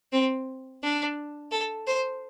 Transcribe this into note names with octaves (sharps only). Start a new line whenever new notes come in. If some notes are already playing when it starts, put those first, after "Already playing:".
C4
D4
A4
C5